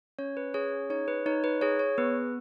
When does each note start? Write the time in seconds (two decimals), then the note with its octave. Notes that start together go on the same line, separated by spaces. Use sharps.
0.19 C#4 C#5
0.37 B4
0.54 G#4 C#5
0.90 D#4 C#5
1.08 B4
1.26 D#4 C#5
1.44 B4
1.62 G#4 C#5
1.79 C#5
1.98 B3 B4